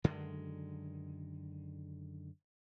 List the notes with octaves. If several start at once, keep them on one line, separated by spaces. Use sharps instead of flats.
F#2 D3 D#3 G#3